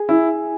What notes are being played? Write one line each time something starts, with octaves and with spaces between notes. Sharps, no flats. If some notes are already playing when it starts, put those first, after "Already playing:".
Already playing: G#4
E4